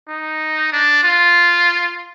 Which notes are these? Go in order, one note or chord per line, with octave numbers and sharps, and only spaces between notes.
D#4
D4
F4